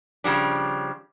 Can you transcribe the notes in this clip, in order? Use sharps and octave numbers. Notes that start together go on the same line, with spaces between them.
C#3 F3 G3 D4